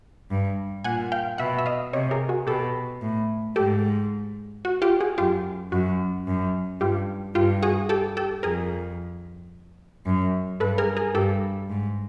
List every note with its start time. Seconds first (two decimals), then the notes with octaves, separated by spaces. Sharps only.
0.30 G2
0.84 A#2 F#5 G#5
1.12 F5 G5
1.38 B2 E5 F#5
1.59 E5
1.66 D#5 F5
1.93 C3 C#5 D#5
2.11 G#4 A#4
2.29 F#4 G#4
2.47 B2 G4 A4
3.02 A2
3.56 G#2 G4 A4
4.65 F#4
4.82 F4 G4
5.00 F#4 G#4
5.18 F#2 F4 G4
5.72 F#2 F#4
6.27 F#2
6.81 G2 F4 G4
7.35 G2 F4 G4
7.63 F#4 G#4
7.89 G4 A4
8.17 G4 A4
8.43 F2 G#4 A#4
10.06 F#2
10.60 G2 A4 B4
10.78 G#4 A#4
10.97 G#4 A#4
11.15 G2 G4 A4
11.69 G#2